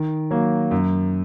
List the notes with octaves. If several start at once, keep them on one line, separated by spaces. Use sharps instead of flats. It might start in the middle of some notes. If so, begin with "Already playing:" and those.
Already playing: D#3
F#3 A#3
F#2